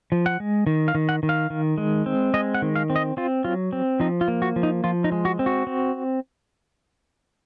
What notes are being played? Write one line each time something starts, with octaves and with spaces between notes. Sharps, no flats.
F3
F#5
G#3
D#3
F5
D#3
F#5
D#3
F5
D#3
G#3
C4
G#3 D#5
F#5
D#3
F5
C4
D#5
C4 F4
F#3 F4
C4
F3 D#4
F4
A#3
F#4
F3
D#4
F3 F4
D#4
G#3
F#4
C4
F#4
C4